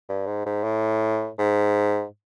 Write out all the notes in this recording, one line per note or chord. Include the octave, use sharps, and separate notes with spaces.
G2
G#2
G#2
A2
G#2